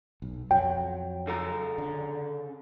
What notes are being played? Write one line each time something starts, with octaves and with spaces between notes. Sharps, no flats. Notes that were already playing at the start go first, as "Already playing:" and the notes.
B1
F2 F#3 G5
C#3 A4 A#5
D3